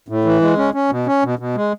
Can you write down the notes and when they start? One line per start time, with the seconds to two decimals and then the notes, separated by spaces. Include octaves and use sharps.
0.08 A2
0.24 E3
0.41 G#3
0.58 C#4
0.74 C#4
0.90 B2
1.07 C#4
1.23 B2
1.39 B2
1.56 G#3